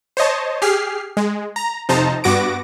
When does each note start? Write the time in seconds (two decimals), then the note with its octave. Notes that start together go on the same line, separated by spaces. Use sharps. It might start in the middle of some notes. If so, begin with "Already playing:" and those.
0.17 C5 C#5 D#5 A5
0.62 G4 G#4 F6 C7
1.17 G#3
1.56 A#5
1.89 F2 C3 D#4 C5 A5 A#5
2.24 G2 B3 F#4 D6 A#6 D7